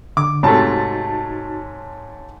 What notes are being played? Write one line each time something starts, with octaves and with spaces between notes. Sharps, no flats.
D3 D6
G#2 C3 A3 D#4 F#4 C#5 A5 A6